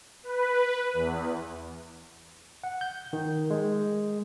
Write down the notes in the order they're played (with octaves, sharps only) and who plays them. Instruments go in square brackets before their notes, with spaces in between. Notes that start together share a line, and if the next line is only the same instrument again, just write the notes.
[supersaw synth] B4
E2
[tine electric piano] F#5
G6
D#3
G#3